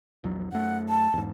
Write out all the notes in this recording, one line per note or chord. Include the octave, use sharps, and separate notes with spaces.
A#1 E2 F#3
F#2 A3 F#5
A5
E2 G#2